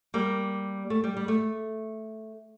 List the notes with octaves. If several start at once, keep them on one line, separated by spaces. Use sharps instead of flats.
G3 A#3
A3
G3
G3
A3